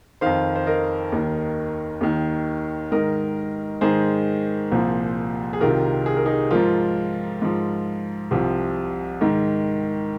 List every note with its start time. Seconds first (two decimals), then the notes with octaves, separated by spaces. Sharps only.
0.21 F2 D#3 C5 F5
0.56 C5
0.66 A#4 D#5
1.12 D#2 D#3
2.01 D#2 D#3
2.92 G#2 D#3 A#4 D#5
3.81 G#2 D#3 G#4 C5
4.71 C2 A#2 F3
5.53 G#4
5.61 C2 C3 D#3 F4 A#4
6.06 G#4
6.17 A#4
6.25 D#4 G#4
6.51 G#2 F3 F4 A#4
7.42 G#2 F3
8.31 C2 C3 F3
9.21 G#2 D#3